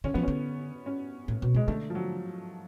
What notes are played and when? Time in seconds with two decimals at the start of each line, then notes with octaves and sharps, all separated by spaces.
0.04 D3 C#4
0.14 F3 B3
0.23 D3 C#4
0.86 C#4
1.28 A2
1.42 B2
1.55 C#3 G#3
1.68 D3 A3
1.90 F3
1.95 F#3